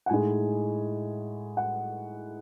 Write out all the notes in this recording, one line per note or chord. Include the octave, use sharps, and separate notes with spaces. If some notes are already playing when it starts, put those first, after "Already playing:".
F#5
A2 G#3 D#4 G#5
F#5